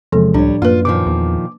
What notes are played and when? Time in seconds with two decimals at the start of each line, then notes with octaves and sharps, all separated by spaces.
0.12 E2 C3 F3 G#3 A4
0.34 C#2 A2 G3 D4 C#5
0.62 F#2 A#3 F4 B4
0.85 A#2 D#3 F3 D6
1.06 E2